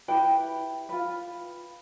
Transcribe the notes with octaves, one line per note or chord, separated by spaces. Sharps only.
E4 G4 B4 G5
F4 B4